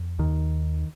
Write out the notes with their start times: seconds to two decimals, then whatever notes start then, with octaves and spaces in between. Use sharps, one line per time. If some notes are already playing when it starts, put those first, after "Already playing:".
Already playing: F2
0.19 D#2 D#3